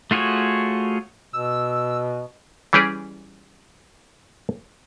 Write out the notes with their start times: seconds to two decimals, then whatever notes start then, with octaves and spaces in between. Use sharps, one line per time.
0.11 A3 F4 F#4 G#4 C#5
1.33 B2 E6
2.73 E3 G3 C#4 G4 G#4 D5